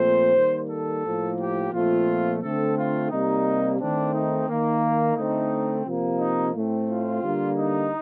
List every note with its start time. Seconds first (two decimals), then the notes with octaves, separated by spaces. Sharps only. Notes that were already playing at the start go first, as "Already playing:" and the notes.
Already playing: A#2 F3 A3 C4 C5
0.36 D#3 G3 A#3
0.70 A4
1.05 A2 F3 A#3
1.39 G4
1.73 A#2 F3 A3 C4 F4
2.42 D3 A3 C4 A4
2.77 F4
3.11 C3 G3 A#3 D#4
3.79 D#3 A3 C4 D4
4.14 D#4
4.49 D#3 A#3
5.16 D3 A3 C4 D#4
5.85 C3 F3 A#3
6.19 D#4
6.55 A2 A3 C4
6.89 F4
7.22 D3 G3 A#3
7.58 D#4